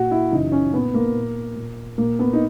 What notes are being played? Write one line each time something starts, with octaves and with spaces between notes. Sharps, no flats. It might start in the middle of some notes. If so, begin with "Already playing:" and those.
Already playing: A#2 F#4
E4
F#2 C#3 E3 D#4
C#4
A#2 B3
A#3
A#2
A#2
A#2 A#3
B3
D#4